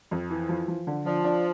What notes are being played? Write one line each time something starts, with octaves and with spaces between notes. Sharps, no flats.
F2
E3
F3
F3
D3
F3 D4
D4